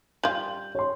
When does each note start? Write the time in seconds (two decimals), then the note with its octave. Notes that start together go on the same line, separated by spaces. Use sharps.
0.23 G3 F4 G6 F#7
0.75 C#5 C6